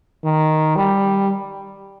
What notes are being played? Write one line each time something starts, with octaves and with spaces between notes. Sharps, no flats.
D#3
G3